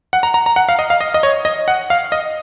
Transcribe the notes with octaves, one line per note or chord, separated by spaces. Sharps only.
F#5
A#5
A#5
A#5
F#5
F5
D#5
F5
D#5
D#5
C#5
D#5
F#5
F5
D#5